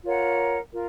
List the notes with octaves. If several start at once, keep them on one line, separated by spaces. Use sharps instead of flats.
F4 A#4 C#5 F#5
F4 A#4